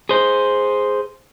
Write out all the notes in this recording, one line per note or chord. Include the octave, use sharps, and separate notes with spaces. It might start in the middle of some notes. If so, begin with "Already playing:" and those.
G#4 C5